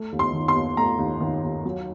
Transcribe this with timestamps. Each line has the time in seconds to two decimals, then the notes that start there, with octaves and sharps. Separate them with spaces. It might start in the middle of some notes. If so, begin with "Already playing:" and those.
Already playing: A3
0.12 D#2
0.19 C6
0.33 D#3
0.48 C6
0.55 D#2
0.77 A3 A#5
0.99 D#2
1.20 D#3
1.43 D#2
1.65 F#3